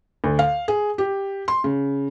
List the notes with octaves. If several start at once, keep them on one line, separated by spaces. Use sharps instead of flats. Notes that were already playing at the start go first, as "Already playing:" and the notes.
D2
F5
G#4
G4
C6
C#3